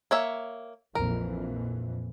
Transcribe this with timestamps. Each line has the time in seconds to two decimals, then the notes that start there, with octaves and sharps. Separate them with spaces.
0.11 A#3 C#5 E5
0.95 A#1 F2 E3 A#4